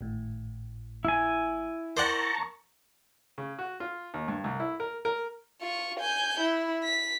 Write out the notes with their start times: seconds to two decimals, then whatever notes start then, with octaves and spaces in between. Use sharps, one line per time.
0.01 G#1 A2
1.05 E4 G#5
1.97 A#4 C5 D5 F#5 A5 A#5 C#6
3.38 C#3
3.59 F#4
3.80 F4
4.14 D#2
4.28 G2
4.44 C2
4.60 E4
4.80 A#4
5.05 A#4
5.61 F4 C#6
6.00 G#5 G6
6.40 E4
6.84 B6